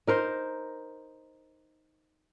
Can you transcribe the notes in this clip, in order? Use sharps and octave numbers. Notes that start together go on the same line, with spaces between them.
D#4 A#4 C5